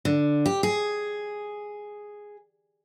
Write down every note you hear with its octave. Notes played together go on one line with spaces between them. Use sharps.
D3
G4
G#4